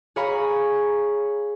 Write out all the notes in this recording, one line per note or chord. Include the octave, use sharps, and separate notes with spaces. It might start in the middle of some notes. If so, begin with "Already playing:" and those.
G#4 C#5 F5 A#5 B5 C#6